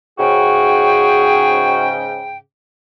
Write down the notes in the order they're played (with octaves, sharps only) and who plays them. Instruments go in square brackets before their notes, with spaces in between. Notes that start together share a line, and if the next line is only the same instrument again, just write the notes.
[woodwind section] G#2 C#3 G5 [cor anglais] F#4 [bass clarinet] G#4